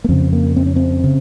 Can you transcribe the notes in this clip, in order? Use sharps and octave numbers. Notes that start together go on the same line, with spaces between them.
A#3
F2 C#3 C4
A#3
C4
C#4
C4
C#3